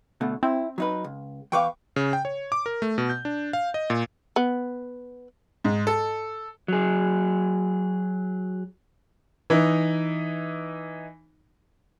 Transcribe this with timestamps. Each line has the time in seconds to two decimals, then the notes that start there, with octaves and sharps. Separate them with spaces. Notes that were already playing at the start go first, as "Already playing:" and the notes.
0.21 B2 D3 A3
0.43 C4 E4
0.78 F#3 D#4 B4
1.04 C#2
1.52 E2 B4 F5 G5 C#6 D6
1.96 C#3
2.13 G5
2.25 C#5
2.52 D6
2.66 A#4
2.82 A3
2.98 B2
3.10 G6
3.25 D4
3.53 F5
3.74 D#5
3.90 A#2
4.36 B3
5.64 G#2
5.87 A4
6.68 F#3 G#4
9.50 E3 D#4